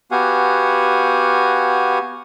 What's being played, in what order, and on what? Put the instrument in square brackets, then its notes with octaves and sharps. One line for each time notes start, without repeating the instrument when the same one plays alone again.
[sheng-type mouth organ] B3 F#4 G4 F5 F#5 G#5